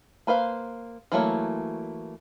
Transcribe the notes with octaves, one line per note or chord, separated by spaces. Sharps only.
A#3 B4 C5 F5
E3 F#3 A3 A#3 C#5